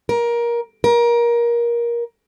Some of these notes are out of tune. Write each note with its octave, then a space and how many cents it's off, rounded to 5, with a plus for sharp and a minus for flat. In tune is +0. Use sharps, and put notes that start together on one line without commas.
A#4 +20
A#4 +20